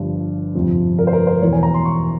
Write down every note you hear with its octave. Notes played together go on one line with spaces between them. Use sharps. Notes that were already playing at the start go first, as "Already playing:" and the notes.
Already playing: G1 G2 F3
G1 F2 C3 F3
A#4
C5
A#4
C5
E1 E2 E3 C#5
G#5
A#5
C6
C#6